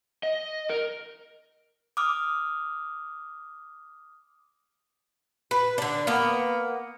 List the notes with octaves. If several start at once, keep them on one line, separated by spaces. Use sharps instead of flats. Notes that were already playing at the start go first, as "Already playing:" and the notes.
D#5
A#4
D6 D#6 F6
B4
D3 D4
A#3 B3